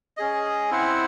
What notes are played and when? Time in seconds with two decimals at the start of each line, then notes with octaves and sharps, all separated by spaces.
0.17 C#4 G#4 D#5
0.70 C4 E4 C5 F#5